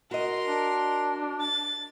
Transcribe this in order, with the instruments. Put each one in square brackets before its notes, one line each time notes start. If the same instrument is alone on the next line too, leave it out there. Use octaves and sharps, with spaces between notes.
[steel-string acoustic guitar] F#4 D#5 [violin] A#4 C6
[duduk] D4
[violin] A6